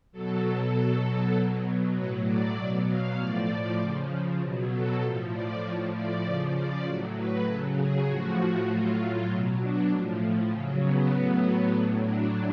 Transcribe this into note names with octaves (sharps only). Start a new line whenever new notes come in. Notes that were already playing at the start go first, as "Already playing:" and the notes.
B2 F#3 A4
B2 F#3 A4
B2 F#3
A2 F#3 B4
D5
B2 F#3 D5
F5
A2 F3 D5
C#3 F3
B2 F#3
A4
A2 F3
D5
A2 F3 C#5
D5
C#3 F3 D5
D5
A2 F#3
B4
C#3 F#3 A4
G#4
A2 F3 F#4
A2 F#3 F4
B2 F#3
D4
A2 F3
C#3 F#3 C#4
B3
A2 F#3 B3
A2 F#3 D4
D4